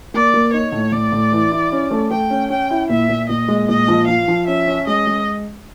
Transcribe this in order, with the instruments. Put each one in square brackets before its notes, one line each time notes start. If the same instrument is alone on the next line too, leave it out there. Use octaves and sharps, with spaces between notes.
[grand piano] A#3 [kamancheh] D5
[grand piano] A#3
[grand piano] D#4 [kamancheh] C#5
[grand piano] A2
[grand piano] A2 [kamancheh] D5
[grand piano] A2
E3
E4
C#4
A3
[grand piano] A3 [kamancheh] G5
[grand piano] C#4
[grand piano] C#4 [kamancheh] G5
[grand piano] E4
[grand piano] A#2 [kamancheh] E5
[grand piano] A#2
[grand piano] A#2 [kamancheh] D#5
[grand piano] G#3
[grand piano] A#2 [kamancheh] D#5
[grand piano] F3
[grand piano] F3 [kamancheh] F5
[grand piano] F3
[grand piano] C#4 [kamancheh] E5
[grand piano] C#4
[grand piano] G#3 [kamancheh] D#5
[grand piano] G#3